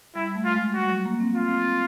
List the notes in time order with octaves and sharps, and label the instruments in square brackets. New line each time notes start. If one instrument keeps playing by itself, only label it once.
[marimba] G3 [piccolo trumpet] E4
[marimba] A3
[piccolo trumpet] F4
[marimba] G#3
[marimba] G3 [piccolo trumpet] F#4
[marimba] F#3
A#3
C4
[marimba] C4 [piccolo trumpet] F4
[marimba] C4